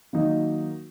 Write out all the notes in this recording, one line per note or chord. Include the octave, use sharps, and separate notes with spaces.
D#3 F#3 A#3 D#4